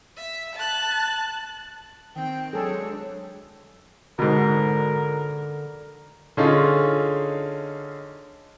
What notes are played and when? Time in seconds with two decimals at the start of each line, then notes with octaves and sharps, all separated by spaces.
0.16 E5
0.55 A5 F#6
2.15 D#3 C4 G5
2.53 F#3 G#3 D4 G#4 A4 C#5
4.19 G#2 B2 D3 A#4
6.37 D3 C#4 D#4 F4 G#4